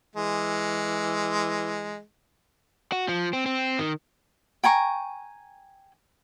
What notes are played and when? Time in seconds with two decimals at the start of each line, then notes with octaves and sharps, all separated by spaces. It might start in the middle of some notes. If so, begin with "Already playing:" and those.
0.16 E3 G#3
2.92 F#4
3.09 F3
3.33 C4
3.46 C4
3.79 D#3
4.63 G5 G#5 A#5 C#6